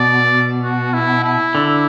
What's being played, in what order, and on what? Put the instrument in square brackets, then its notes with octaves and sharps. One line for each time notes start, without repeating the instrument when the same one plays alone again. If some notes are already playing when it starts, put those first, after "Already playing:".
Already playing: [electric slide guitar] B2 [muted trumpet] D5
[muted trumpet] F#4
E4
E4
[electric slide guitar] D3